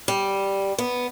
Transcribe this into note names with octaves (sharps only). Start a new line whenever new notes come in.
G3
B3